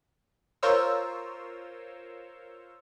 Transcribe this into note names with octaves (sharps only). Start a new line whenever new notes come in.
F4 A#4 C5 C#5 E6